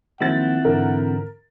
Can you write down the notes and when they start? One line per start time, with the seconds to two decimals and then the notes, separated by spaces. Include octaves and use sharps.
0.20 D#3 F3 F#3 A#3 C4 E4 F#5 A6
0.65 G#2 D3 E3 A#4